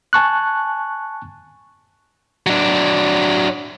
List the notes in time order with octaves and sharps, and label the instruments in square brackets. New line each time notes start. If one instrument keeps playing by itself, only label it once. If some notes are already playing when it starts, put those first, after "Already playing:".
[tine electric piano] G#5 A5 C#6 F#6
[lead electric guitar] F#3 D4